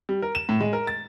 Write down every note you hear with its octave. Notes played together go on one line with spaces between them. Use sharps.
G3
A#4
E7
A2
G#3
A#4
A6